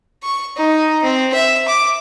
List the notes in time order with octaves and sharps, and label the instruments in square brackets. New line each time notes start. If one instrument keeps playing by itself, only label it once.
[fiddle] C#6
D#4
C4
E5
D6